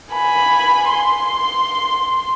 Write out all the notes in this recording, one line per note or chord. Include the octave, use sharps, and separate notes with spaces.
G#5 B5
C6